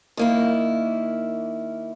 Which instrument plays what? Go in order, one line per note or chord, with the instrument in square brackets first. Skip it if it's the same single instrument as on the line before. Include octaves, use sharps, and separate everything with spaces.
[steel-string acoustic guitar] D#3 A#3 E4